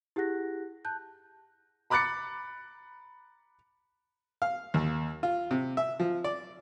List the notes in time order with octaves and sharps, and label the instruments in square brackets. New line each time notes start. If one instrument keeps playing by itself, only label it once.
[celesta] E4 G4 G#4 F#5 F#6 A#6
A5 F#6 G6
[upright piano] A#5 B5 D6 F#6 A6 C#7
[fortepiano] F5
D#2
F4
C3
E5
F3
D5